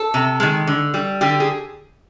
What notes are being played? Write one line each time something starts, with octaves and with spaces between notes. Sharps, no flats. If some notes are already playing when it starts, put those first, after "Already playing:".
Already playing: A4
C3
D#3 G#3
D3
G3
D3 G4
G#4